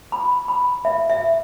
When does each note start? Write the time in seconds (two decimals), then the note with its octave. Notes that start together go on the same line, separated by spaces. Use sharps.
0.12 B5
0.48 B5
0.85 E5
1.10 E5